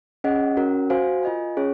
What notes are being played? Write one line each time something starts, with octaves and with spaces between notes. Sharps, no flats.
C#4 G#4 D#5 F#5
C#4 F#4 A#4
F#4 C5 F5 G#5
F4 A#4 D#5 G#5
C#4 G#4 C#5